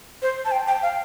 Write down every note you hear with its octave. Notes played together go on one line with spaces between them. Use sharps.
C5
A5
G5
G5
F5